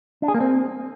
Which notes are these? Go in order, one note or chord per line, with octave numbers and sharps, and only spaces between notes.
D4
G#4
A#3
C4